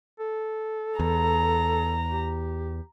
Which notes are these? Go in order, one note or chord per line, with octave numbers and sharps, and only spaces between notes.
A4
E2 A#5
G4